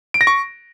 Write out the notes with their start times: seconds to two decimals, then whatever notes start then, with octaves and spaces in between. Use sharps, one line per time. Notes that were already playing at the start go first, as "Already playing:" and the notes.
0.14 D7
0.21 A#6
0.27 C#6